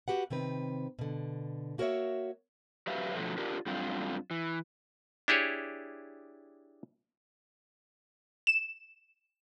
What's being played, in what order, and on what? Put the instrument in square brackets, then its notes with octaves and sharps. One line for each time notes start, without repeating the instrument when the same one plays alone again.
[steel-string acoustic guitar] F#4 G4 B4 F#5
C3 D#3 C4 B4
B2 D3
A#3 F#4 A#4 C5 C#5 E5
[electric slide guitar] F#3 G4 B4 E5 F5
B2 D3 F3 F#3 A3
D4 F4 G4 A#4
F#2 G3 A3 C4 D4 F4
E3
[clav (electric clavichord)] D4 E4 G4 G#4 C#5
[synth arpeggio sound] E7